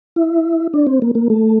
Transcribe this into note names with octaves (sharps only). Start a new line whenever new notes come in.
E4
D4
C4
A#3
A#3
A3